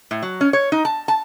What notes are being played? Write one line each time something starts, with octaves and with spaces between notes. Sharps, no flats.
A2
F#3
C#4
C#5
D#4
A5
A5